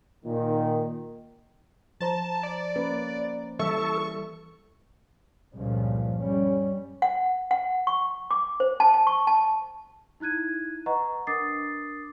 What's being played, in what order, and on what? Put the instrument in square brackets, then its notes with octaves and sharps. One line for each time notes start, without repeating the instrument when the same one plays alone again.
[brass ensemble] A#2 D#3
[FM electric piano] F3 C5 A#5 [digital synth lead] A5
[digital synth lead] D5
[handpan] A#3 C#4 B4
[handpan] E3 G3 E5 [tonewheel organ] A4 [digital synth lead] C#6
[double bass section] C#2 G2 A#2 F3
G3 C#4
[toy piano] F#5
F#5
C#6
D6
C5
A5
A5
C#6
A5
[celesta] D#4 E4 F#6 G#6 D#7
B4 D#5 F#5 A#5 C#6
D4 A#4 D6 D#6 A6 C7